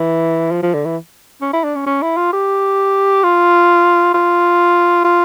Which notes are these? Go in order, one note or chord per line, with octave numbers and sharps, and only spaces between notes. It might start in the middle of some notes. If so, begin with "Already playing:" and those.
Already playing: E3
F3
F3
D3
E3
C#4
E4
D4
C#4
C#4
E4
F4
G4
F4
F4
F4